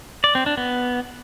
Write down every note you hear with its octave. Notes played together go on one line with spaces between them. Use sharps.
D5
C4
D4
B3